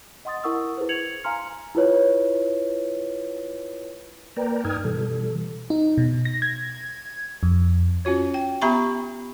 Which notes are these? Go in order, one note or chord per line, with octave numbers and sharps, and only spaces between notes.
D#5 F#5 C6 D#6 A6
E4 A#4 F#5 C#6 D#6 E6
E4 G#4 B4 C5
G#6 C#7 F7 F#7
F5 G#5 A#5 C6 F6 C#7
E4 F4 B4 C#5
A#3 A#4 B4 D5 G5 A#5
G2 D#4 G5 D#6 F6 G#6
B2 E3 G3 A4
D#4
B2
A#6
G#6
F2
C#4 F4 F#4 C#5
G5
B3 G4 E5 A#5 B5 C#6